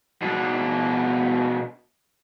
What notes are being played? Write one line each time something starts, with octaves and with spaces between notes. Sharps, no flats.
B2 D4